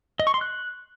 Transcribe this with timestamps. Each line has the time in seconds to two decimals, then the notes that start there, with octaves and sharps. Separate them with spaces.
0.20 D#5
0.27 C#6
0.34 C6
0.41 F#6